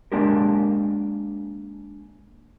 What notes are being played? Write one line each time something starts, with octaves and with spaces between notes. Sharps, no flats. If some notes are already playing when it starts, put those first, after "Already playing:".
G#3 A#3 D4 G4 A#4